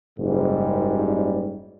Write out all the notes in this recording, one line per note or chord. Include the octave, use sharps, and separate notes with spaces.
F#1 G#2 G3